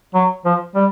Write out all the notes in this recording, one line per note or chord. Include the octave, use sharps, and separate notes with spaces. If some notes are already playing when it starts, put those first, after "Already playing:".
F#3
F3
G3